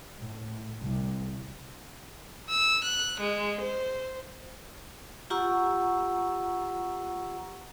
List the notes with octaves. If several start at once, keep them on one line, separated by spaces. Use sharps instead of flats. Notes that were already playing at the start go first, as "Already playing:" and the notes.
A2
C2
E6
F#6
G#3
C5
F4 G4 F#5 A#5 C#6 E6